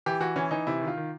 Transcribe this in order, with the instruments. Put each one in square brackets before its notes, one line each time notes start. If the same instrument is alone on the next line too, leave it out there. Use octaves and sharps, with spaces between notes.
[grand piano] E3 G4
E3 F#4
E3 C#4
E3 D#4
C3 E4
D#3
F4
D#3